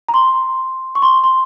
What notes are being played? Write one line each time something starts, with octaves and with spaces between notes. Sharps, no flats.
A#5
C6
C#6
C6
C6